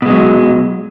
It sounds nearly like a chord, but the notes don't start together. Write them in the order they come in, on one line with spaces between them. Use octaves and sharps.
B2 G#3 F#3